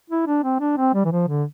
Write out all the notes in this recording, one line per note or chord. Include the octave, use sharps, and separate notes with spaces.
E4
D4
C4
D4
C4
G3
E3
F3
D3